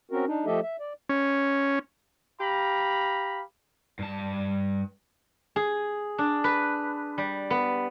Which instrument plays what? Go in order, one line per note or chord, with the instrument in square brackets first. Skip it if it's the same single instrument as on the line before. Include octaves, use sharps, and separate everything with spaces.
[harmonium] C4 C#4 F#4 A#4
D4 D#4
F3 A3 G4 A4 D#5 E5
E5
D5
[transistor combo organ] C#4
[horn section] G4 F5 A#5 B5
[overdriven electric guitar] G2 A5
[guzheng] G#4
D4
B4
G3
B3